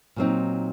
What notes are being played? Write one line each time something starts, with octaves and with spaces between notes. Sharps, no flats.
A#2 F#3 C4 D#4